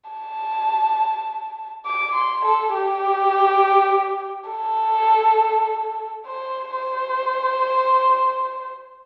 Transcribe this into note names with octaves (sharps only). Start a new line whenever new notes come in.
A5
D6
C6
A4
G4
A4
C5
C5